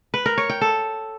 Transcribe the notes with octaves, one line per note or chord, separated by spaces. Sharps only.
B4
A#4
C#5
G5
A4